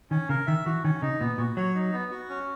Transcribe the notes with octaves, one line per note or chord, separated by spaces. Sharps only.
D#3 C#4
C#3 A#4
D#3 E5
E3 F#4
D#3 C#4
C#3 D#4
A#2 B3
A#2 F#4
F#3 C#5
D#4
B3
F#4
C#4